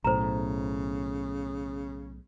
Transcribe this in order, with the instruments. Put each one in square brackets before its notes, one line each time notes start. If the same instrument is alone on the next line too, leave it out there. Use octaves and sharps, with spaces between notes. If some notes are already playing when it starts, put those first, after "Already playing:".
[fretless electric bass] B1 A2 [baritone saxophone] C#3 [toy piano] C5 A#5